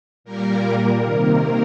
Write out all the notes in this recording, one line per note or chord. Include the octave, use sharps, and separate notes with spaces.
A#2 G3 A#3 A#4
C3 D#3 A#3 A#4